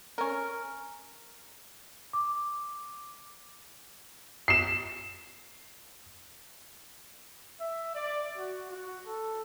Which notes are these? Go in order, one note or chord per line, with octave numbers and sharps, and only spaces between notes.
C#4 A#4
D6
C7 E7
E5
D5
F#4
F#4
A4